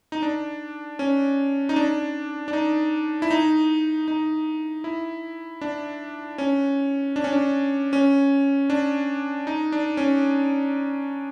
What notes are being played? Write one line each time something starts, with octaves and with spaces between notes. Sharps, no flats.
D#4
D4
C#4
D#4
D4
D4
D#4
E4
D#4
D#4
E4
D4
C#4
D4
C#4
D4
C#4
D4
D#4
D4
C#4